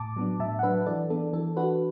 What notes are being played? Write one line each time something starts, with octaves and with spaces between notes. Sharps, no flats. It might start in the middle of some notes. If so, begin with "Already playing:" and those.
Already playing: A2 A5 D6
F#3 B3 D4
A2 E5 A5
F#5
F#3 D4 B4 E5
E3 A4 D5
B3 D4 A4
E3 A4
D4 F#4 B4